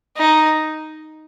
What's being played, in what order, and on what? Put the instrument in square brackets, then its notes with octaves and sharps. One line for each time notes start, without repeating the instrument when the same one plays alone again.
[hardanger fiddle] D#4